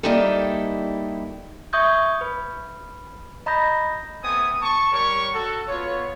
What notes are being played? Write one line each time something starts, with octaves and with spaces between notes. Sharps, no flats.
G3 A#3 D#4 E4 G4 A4
E5 C#6 D#6 G6 G#6
B4 B5
D#5 A#5 B5 D#6 G6 A#6
A3 B3 C4 G#5 D#6
A5 C#6
G3 A#4 C#5 C#6
F#4 A4
B3 F4 C#5